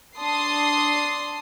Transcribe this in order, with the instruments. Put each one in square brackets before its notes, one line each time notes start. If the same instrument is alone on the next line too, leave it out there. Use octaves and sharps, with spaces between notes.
[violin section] D4 A5 C6 D#6 C7